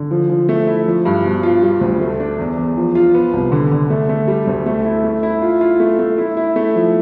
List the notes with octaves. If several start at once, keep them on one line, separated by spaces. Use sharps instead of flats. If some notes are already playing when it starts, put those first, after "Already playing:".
Already playing: D3
F3
F3
A3
E4
F3
G2
B2
F4
G3
D2
A3
D4
E2
E2
F3
F4
B3
C2
D3
D3
A3
A3
G3
D2
A3
E4
A3
E4
F4
F4
A3
A3
E4
E4
A3
F3